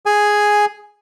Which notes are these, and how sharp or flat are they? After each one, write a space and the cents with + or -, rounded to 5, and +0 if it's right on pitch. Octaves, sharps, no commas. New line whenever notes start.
G#4 +0 G#5 +0